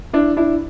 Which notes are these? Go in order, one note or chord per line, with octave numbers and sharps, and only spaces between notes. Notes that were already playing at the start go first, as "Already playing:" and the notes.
D4 E4
D4 E4